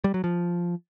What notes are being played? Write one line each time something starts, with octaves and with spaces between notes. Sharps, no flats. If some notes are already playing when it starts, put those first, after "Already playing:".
G3
F#3
F3